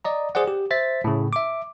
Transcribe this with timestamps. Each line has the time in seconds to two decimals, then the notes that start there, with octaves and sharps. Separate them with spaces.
0.05 D5 D#5 A#5
0.35 G#4 C5 D5 F#5
0.48 G4
0.71 C5 E5 A6 B6
1.04 A2 C#3
1.33 E5 D6